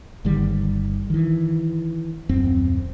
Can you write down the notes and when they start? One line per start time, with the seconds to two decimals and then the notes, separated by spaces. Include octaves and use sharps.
0.25 G1 D3 D#3 G3
1.10 D#3 E3
2.29 D#1 F#2 C4